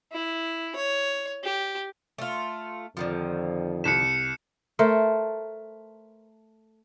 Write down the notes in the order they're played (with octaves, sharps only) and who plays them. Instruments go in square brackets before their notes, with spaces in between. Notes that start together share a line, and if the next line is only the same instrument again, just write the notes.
[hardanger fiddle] E4
C#5
G4
[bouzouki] A3 F4
[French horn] F2 [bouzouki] D3 D#3 F3
[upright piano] C2 B6 [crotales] C#7 E7
[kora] A3 A4 A#4 C5